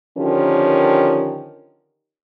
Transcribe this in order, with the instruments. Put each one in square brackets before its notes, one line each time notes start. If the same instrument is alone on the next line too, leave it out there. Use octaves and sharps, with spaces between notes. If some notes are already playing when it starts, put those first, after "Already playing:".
[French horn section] D3 D#3 F3 C#4 G4 A#4